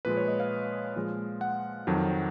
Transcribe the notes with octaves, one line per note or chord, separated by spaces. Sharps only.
A#2 F3 G#3 B4
C#5
D#5
F5
A#2 F3 G#3
F#5
F2 D#3 F#3